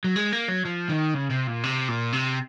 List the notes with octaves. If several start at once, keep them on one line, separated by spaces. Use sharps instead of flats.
F#3
G#3
A#3
F#3
F3
D#3
C#3
C3
A#2
C3
A#2
C3